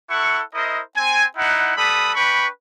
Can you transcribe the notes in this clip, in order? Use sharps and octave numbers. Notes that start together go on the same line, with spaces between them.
E4 A4 F#5 C#6
E4 A#4 C5 D#5
C4 G#5
D#4 E4 F#5
G3 A4 B4 B5 D#6
D4 B4 G5 B5 C#6